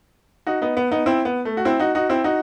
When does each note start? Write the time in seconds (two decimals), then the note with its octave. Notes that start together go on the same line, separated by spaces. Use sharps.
0.47 D#4 F#4
0.62 B3 D#4
0.77 B3
0.92 B3 D#4
1.06 C4 E4
1.25 B3
1.45 A3
1.57 F#4
1.65 C4 E4
1.79 D#4 F#4
1.95 D#4 F#4
2.09 C4 E4
2.24 D#4 F#4